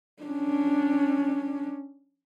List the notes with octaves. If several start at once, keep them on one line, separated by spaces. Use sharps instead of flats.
C#4 D4